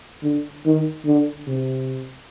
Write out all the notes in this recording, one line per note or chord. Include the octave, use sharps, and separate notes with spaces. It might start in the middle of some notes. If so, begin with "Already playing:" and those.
D3
D#3
D3
C3